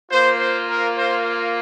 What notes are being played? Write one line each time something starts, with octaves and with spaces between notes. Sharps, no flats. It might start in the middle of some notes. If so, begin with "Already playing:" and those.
A#3 F4 C5
C5
A#4
C5